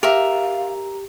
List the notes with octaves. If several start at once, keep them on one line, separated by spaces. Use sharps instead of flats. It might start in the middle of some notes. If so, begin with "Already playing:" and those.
G4 A#4 E5 F5 A#5